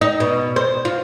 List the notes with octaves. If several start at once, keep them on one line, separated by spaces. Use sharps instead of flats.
D#4
B2
C5
F4